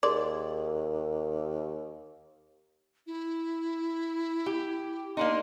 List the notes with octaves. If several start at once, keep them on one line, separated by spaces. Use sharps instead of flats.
D#2 G#4 A#4 D5 C6
E4
G4
A#3 D4 D#4 C6